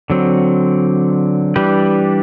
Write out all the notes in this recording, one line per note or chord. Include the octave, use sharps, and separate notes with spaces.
D3 F#3 C4
E3 G3 D4 G4 B4